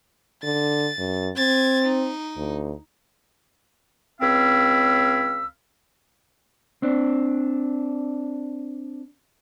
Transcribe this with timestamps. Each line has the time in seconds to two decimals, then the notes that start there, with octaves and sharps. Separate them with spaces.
0.43 D3 A6
0.98 F#2
1.37 C4 G#6 A6
1.85 D#4
2.37 D2
4.21 C#2 C4 C#5 F5 B5 E6
6.82 C4 D4